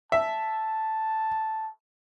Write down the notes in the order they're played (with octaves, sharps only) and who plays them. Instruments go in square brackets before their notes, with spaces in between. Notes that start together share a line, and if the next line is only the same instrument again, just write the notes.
[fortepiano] E5 [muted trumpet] A5